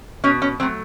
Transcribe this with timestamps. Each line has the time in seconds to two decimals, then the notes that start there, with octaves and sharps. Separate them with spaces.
0.24 B2 C#4
0.42 C#4
0.60 F#3 A3 C4